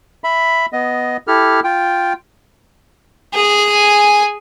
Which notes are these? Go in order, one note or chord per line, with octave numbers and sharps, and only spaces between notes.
E5 B5
B3 D#5
E4 G4 A4 F6
F4 G5
G#4 G#5